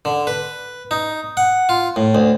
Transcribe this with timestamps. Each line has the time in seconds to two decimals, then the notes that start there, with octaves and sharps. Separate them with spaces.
0.05 D3
0.27 B4
0.91 D#4
1.37 F#5
1.69 F4
1.96 A2
2.15 D2